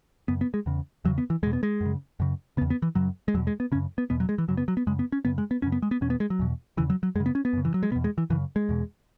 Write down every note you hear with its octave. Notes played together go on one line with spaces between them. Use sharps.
F#2 C#3 B3
B3
G#3
E2 C#3
E2 C#3 F#3
B3
E3
E2 B2 G#3
B3
G#3
F#2 C#3
F#2 C#3
E2 C#3 B3
B3
E3
F#2 C#3 F#3
G#3
E2 B2 F#3
G#3
B3
F#2 C#3 C#4
B3
E2 B2 B3
F#3
G#3
E3
F#2 C#3 F#3
B3
F#3
B3
F#2 C#3 G#3
B3
C#4
F#2 C#3 B3
G#3
B3
F#2 C#3 C#4
B3
G#3
B3
E2 B2 C#4
B3
G#3
F#3
E2 B2
E2 C#3 E3
F#3
F#3
F#2 C#3 G#3
B3
C#4
B3
F#2 C#3
E3
F#3
G#3
E2 B2 B3
G#3
E3
F#2 C#3 E3
G#3
E2 B2